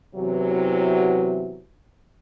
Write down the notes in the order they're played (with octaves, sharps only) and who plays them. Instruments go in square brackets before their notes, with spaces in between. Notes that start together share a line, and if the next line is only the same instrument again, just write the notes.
[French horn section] E2 C3 E3 F#3